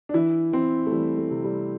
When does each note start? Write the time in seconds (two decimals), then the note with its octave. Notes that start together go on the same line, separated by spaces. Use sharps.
0.09 D4
0.14 E3 E4
0.52 E3 C4
0.87 A3
0.91 E3 G3
1.18 A3
1.31 C3
1.44 G3